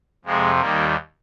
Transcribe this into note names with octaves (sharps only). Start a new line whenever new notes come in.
F2 C3 F3 G#3
D#2 D#3 G3 A#3